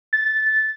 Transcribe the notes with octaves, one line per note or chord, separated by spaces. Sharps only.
A6